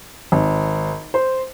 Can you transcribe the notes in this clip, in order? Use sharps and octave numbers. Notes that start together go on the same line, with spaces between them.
G#1
C5